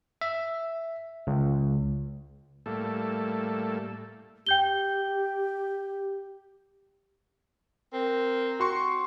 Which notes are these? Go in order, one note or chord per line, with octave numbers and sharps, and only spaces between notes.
E5
C#2
A2 G3 A3 A#3 A4
G4 G5 G6 G7
C4 A#4
F#4 C6 C#6